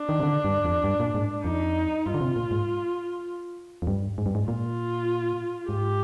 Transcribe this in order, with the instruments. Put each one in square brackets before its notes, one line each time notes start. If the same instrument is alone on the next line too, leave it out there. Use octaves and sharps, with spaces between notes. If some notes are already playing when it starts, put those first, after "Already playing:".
Already playing: [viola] D4
[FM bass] D#3
C3
D3
G2
F2
G2
A#2
G#2
[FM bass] F2 [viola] D#4
[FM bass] G2 [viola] F4
[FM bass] D3
C3
A#2
G#2
F2
G2
G#2
G2
G#2
[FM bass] A#2 [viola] F4
[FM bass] G#2 [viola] G4